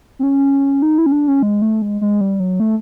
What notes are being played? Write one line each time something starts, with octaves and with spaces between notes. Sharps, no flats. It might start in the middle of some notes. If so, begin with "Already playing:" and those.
C4
C#4
D#4
E4
C#4
D4
C#4
G#3
A3
G#3
G#3
G3
F#3
A3